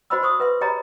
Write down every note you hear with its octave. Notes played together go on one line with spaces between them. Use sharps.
F#4 C5 D#5 B5 C6 E6
C5 C6 C#6 D#6
B4 E5 C6
G4 G#4 C#5 D#5 A#5 B5